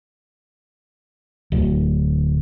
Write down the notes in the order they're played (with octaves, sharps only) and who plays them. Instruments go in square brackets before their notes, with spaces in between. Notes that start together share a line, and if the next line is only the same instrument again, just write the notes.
[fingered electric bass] D1